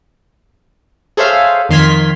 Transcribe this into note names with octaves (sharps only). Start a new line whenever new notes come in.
G#4 A4 C5 C#5 E5 F5
F2 D#3 C6 F6 G#6 B6